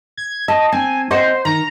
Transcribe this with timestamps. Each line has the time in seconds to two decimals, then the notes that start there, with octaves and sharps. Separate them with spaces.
0.17 G#6
0.48 D#5 A5
0.72 C4 G#5
1.11 C4 C5 D#5 F#5
1.45 D#3 A#5